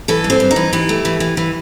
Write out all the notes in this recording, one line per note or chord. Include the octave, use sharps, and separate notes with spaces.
E3 A4
G2
C4
G2
D#4
E3
E3 G4
A3
E3
E3
E3